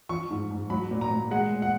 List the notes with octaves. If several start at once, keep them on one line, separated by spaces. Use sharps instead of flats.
F3 C#6
G#2
G#2
F#3 B5
A#2
A#5
A#2
G#3 F#5
A#2
F#5